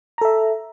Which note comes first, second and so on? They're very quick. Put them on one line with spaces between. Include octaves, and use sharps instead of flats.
A#5 A4 E5